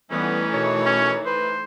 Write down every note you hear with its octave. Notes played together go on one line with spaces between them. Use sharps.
E3 G3 A3 B3 C#4 D#4
B2 A#4 C#5
C#4
B4 C5